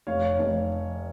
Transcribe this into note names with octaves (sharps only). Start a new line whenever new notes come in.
F1 C#5 F5
F1